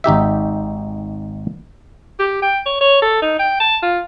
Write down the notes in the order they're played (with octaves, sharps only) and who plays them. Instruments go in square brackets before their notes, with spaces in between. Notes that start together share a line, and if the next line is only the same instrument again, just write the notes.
[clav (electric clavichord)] G#1 D#4 G4 E5
[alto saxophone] G4
G5
C#5
C#5
A4
D#4
G5
A5
F4